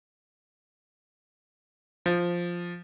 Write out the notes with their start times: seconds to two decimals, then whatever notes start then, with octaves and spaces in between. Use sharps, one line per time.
2.06 F3